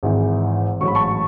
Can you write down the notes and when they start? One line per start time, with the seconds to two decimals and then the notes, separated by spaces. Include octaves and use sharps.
0.03 G#1 G#2 E3
0.81 A1 G#2 F#3 C#6
0.88 B5
0.95 A5 C#6